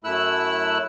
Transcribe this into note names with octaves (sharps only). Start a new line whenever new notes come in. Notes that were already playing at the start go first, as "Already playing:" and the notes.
F#2 A3 E4 E6 F#6